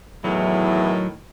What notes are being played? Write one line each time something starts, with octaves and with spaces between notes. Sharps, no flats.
E2 A2 D#3 F#3